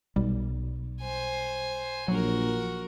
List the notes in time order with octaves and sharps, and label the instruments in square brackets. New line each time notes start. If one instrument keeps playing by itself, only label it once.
[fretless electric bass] B1 [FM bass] G3
[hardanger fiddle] C5 G#5
[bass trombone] A#1 [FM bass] F#3 [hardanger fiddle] F#4 A#4